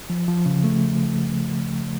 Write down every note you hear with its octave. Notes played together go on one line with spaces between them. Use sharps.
F3
F3
C#3
A3